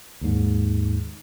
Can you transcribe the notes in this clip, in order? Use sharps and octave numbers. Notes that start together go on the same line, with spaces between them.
D#2 G#2